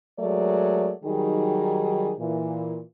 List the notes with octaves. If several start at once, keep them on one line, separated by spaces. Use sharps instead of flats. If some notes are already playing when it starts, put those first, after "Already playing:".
F#3 G#3 A3 A#4 D5
D#3 F#3 G3 D#4 G#4
A#2 E3